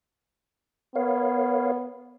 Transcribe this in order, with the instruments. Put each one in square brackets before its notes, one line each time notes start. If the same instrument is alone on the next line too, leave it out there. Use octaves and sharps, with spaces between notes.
[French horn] B3 [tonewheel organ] A#4 C#5 F5